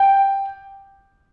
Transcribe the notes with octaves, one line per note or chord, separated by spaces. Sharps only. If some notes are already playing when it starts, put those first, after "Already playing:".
Already playing: G5